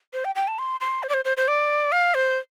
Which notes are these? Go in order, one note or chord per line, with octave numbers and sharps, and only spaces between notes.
C5
G5
G5
A5
C6
C6
C5
D5
C5
C5
C5
D5
F5
C5